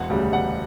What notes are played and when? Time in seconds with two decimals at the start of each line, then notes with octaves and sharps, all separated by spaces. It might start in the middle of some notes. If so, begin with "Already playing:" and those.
Already playing: E1 F#5
0.10 D2 C#3 G3
0.32 E1 F#5